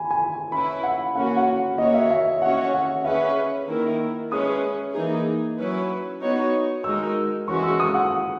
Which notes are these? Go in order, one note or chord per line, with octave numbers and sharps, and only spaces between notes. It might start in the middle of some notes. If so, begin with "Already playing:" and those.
Already playing: G#5 B5
G#5
C#4 E4 B4 B5
F#5
A#3 C#4 F#4 F#5
F#5
A#3 C#4 F#4 C#5 D#5
E5
E5
C#4 F#4 C#5 F#5
F#5
C#4 G#4 B4 E5
D#3 A#3 E4 A#4
G#3 C#4 G#4 B4 D#6
E3 A#3 D#4 G#4
F#3 C#4 E4 B4
B3 D#4 F#4 C#5
G#3 D#4 F#4 A#4 E6
E3 G#3 C#4 F#4 C#6
E6
D#6
F#5